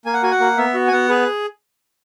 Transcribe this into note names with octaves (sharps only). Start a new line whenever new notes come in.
A#3 G#5
F#5
F#4 G#5
F#5
A#3
B3 E5
F#4
G#5
B3 F#5
G#4 B4